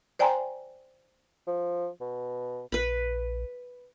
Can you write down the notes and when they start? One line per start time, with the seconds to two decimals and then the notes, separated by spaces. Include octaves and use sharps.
0.19 C5 D5 G5 G#5 A#5 C6
1.47 F3
2.01 B2
2.72 A#1 B4 B5